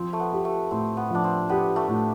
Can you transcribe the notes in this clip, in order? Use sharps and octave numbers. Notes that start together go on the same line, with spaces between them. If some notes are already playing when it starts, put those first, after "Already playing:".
Already playing: F3 C4
A3
B3
G4
A3
A2 C4
B3
F3 D4
C4
B3 G4
A3
A2